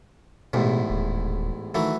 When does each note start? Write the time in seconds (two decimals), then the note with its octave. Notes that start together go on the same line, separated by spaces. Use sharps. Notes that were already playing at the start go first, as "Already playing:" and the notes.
0.53 A1 E2 G#2 B2
0.90 D#1
1.75 D#3 E3 F#3 A3